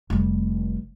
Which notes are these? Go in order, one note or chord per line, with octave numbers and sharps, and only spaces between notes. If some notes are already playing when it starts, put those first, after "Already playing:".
F1 G3